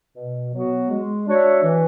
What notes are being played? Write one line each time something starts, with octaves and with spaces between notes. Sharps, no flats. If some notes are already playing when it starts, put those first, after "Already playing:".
B2
F#3 B3 F#4
G#3
D4 F#4 C#5 E5
E3